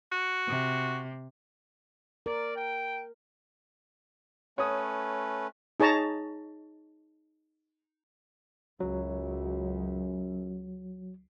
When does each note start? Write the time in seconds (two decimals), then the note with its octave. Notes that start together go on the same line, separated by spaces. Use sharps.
0.12 F#4
0.48 C3
2.26 A#4 D5
2.56 G5
4.58 A3 C#4 B4 C#5 D#6
5.80 D#4 G#4 C#5 A5 A#5
8.80 C#2 F#2 F#3